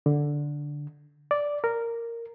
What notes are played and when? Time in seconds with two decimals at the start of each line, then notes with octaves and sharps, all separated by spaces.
0.06 D3
1.31 D5
1.64 A#4